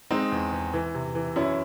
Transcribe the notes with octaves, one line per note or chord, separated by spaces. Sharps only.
G#3 C4 D#4
E2
E2
E3
C3
E3
F#2 C#4 E4